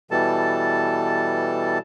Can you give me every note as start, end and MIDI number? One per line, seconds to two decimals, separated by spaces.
0.11 1.78 47
0.11 1.78 52
0.11 1.78 55
0.11 1.78 69
0.11 1.78 81